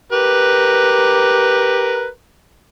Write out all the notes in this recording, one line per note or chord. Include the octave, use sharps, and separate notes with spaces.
G4 A#4 B4